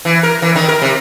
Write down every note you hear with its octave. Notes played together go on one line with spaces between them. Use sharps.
E3
A#4
E3
D#3
A#4
C3